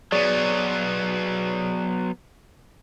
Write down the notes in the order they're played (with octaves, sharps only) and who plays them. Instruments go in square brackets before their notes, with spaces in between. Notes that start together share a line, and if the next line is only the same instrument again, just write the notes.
[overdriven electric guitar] F#3 B3 [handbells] G#4 C#5 D5